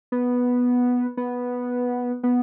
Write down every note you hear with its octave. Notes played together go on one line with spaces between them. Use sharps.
B3
B3
B3